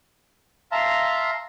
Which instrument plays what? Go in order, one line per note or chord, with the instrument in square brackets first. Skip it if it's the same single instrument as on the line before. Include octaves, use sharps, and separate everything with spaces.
[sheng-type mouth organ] E5 F5 A5 A#5 C6